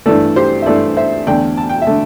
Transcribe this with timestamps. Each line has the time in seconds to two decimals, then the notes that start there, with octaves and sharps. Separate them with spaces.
0.06 G2 E3 A3 A4 D5
0.36 G4 C5
0.62 E5
0.66 G2 E3 A3 A4 D5
0.97 C5 E5
1.27 E2 D3 A3 D5 G5
1.57 A5
1.70 G5
1.82 E5
1.87 D3 A3